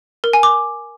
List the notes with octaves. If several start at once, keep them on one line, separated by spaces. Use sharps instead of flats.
A#4
G#5
D6